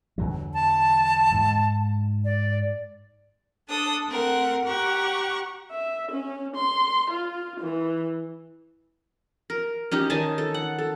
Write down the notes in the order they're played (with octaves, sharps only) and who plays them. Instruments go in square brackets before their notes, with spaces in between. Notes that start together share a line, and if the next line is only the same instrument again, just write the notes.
[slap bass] E2 D3 F#3
[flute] A5
[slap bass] G#2
[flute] D5
[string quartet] D4 A4 D#6
A3 C4 A#4 F#5
G4 F#5 A#5 C#6
E5
C#4
C6
F4
E3
[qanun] A#4
C#4 D#4 G4
D#3 D#4 G#5 A5
A4
F#5
A4